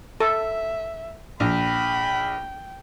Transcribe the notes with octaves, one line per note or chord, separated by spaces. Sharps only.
A4 E5
A#1 G5 B5